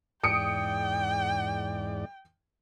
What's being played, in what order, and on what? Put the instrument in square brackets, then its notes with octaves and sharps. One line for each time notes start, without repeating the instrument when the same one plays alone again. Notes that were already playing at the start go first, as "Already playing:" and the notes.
[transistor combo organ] E2 G#2 D5 [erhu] G5 [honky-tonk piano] D#6 C#7 D7